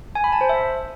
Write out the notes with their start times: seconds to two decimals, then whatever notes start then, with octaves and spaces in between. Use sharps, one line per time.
0.15 G#5
0.24 B5
0.32 A5
0.41 C5
0.49 E5